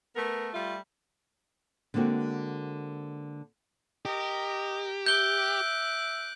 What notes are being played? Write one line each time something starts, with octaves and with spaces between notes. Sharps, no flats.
A3 B3 A#4
G3 A3 F4
D3 G#3 A#3 C4 F#4
G4 A#4 D#5
E5 D6 F#6 G6 G7